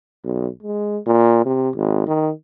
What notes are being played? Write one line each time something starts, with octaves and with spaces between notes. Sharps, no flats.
B1
G#3
A#2
C3
G#1
D#3